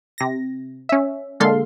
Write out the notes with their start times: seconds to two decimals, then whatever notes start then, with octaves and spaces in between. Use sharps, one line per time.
0.18 C3 A#6
0.89 C#4 E5
1.40 A#2 D3 G#3 A4 F5 C6